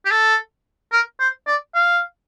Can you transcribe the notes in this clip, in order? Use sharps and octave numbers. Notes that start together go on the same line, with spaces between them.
G4
A4
A#4
C5
D5
F5